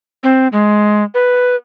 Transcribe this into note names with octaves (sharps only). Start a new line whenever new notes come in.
C4
G#3
B4